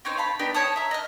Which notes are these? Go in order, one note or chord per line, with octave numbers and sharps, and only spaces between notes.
C4 C#4 D#4 C5
F5 A5 B5
B3 D4 D#4 G4
C#5 A5 D#6
E5 A#5
D#5 F6